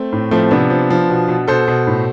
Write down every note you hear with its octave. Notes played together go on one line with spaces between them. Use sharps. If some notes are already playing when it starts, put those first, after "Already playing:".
Already playing: A3 C4
A2
F3 A3 C4
C4
C3 B3 D4
F3
F3
B2
B2
B2 A4 C5
B2
A2